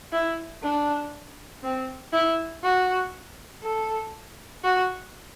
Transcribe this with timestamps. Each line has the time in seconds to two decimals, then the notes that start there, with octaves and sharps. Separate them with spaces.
0.12 E4
0.62 D4
1.63 C4
2.13 E4
2.63 F#4
3.63 A4
4.63 F#4